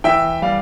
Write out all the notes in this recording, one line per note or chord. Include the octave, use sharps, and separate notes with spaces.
E3 E5 G5
G3 D5 F5